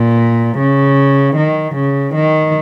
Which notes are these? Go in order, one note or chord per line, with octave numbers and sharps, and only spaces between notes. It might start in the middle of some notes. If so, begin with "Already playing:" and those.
Already playing: A#2
C#3
D#3
C#3
D#3